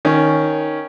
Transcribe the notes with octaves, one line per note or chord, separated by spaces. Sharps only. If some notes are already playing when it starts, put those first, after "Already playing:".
D#3 C#4